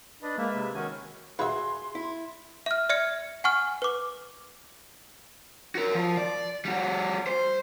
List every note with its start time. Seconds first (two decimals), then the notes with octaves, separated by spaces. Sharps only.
0.22 D4 B4 D#5
0.38 G#3 A#3 B4 E5
0.55 C3
0.75 D#3 C#4 F#4 G#5
1.39 F#4 G#4 B4 E5 F5 C6
1.95 E4
2.66 E5 F6
2.89 D5 E5 F6 G#6 C#7
3.44 F#5 G#5 C#6 F6
3.82 B4 D6
5.75 F#4 A#4
5.95 F3
6.17 D5
6.65 G3 F#4
7.27 C5